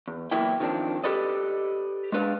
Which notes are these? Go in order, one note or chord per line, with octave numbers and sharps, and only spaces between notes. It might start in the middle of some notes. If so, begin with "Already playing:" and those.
E2
B1 E3 A#3 E4 D5 G5
D#3 F3 B3 C4 D4
G4 A4 B4 D5 D#5
G#3 B3 D4 B4 D5 F5